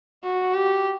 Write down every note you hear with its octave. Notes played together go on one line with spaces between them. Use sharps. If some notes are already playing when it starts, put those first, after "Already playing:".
F#4
G4